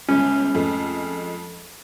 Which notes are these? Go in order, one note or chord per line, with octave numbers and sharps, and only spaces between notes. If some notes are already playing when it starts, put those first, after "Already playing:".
G1 C#2 C#4
F2 G#3 A3